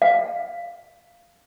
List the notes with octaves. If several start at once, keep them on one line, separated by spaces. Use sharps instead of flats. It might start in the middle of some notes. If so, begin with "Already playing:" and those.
F5